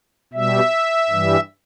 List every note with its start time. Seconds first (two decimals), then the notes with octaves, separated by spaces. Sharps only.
0.34 B2 G3 E5
1.10 G2 E3 G3